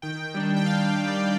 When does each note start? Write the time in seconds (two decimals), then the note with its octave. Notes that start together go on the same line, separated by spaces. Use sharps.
0.02 D#3 G5
0.34 G3 D4
0.56 G5
0.66 D#3 F5
0.87 F5
0.97 G3 D4
1.08 D5